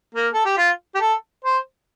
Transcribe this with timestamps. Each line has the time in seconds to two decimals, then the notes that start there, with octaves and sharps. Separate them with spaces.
0.15 A#3
0.33 A4
0.46 G4
0.57 F4
0.95 G4
1.01 A4
1.45 C5